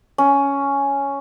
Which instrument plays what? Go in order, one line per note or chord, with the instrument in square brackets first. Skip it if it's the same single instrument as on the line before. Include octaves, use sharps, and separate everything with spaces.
[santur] C#4